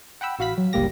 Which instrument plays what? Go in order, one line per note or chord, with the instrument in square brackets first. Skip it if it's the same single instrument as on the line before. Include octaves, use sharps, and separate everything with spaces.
[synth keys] F#5 G5 B5 E6
A1 F#4 F5 B5 B6
F#3
G1 C#2 G3 A#3 G4 A#6